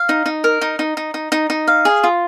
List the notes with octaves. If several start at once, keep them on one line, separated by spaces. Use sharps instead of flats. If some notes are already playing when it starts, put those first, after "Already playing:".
Already playing: F5
D#4
D#4
A#4
D#4
D#4
D#4
D#4
D#4
D#4
F5
G#4
F4